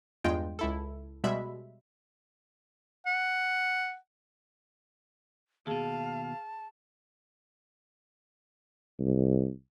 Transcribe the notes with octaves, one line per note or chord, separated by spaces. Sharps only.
E2 G2 G#3 F4 G5
C#2 E4 A4
B2 G3 G#3 E5 B5
F#5
D#2 B2 G#4 F5 A5
C2